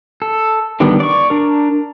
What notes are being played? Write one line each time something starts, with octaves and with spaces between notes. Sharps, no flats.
A4
D3 D#3 G3 B3
D5 C#6
D4 A#4